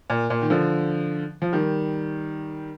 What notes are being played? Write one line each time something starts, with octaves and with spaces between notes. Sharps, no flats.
A#2
A#2
D#3
D3 F3
F3
D#3 G3